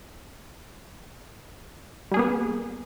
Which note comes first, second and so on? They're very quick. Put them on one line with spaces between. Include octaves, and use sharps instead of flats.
G3 G#4 A#3 B3